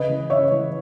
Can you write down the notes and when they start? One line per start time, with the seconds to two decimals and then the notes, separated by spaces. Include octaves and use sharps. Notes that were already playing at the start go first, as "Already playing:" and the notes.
Already playing: C#3 B4 D#5
0.09 E3
0.30 C#3 C#5 E5
0.51 E3